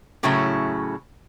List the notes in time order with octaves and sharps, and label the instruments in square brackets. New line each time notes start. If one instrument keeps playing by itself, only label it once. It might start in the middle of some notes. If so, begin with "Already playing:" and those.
[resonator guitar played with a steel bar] A2 C#3 F#3 A3 C#4 E4